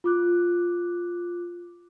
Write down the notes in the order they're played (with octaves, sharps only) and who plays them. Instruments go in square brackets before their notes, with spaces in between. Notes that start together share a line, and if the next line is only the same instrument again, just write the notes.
[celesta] F4 D6 F#6